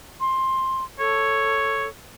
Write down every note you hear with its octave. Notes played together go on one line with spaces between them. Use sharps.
C6
A4 C#5